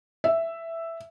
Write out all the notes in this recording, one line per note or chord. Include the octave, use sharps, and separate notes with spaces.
E5